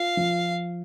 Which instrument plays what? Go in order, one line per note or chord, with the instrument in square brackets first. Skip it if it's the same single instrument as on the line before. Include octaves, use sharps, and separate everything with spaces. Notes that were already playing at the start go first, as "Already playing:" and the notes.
Already playing: [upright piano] F4 [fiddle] F5
[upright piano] F3